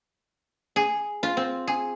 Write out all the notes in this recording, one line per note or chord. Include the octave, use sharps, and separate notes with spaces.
G#4
F4
C4
G#4